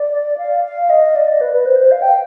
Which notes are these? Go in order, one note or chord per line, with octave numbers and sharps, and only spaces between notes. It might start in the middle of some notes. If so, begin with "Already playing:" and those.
Already playing: D5
F5
F5
D#5
D5
B4
B4
C5
C5
F5
G5